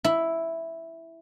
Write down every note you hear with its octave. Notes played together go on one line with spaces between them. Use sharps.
E4